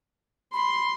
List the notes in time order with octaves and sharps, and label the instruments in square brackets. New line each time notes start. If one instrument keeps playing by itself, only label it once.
[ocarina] B5 [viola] C6